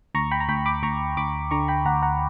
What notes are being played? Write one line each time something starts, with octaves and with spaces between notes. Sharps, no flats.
D2 A#5 C#6
G5 B5
A#5
D2 G5 B5
B5 D6
D2 A#5 C#6
D2 B5 D6
D3 A#5 C#6
G5 B5
D2 F#5 A#5
F#5 A#5